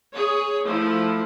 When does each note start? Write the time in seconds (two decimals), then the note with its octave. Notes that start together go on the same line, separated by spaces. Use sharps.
0.14 G#4 C#5
0.65 F3 A3 E4